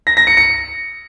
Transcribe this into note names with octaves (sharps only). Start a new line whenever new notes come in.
A#6
A#6
C#7
C#7